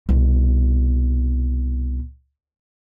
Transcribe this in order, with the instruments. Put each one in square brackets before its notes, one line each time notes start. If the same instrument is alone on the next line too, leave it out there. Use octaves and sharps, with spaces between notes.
[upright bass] C2 B2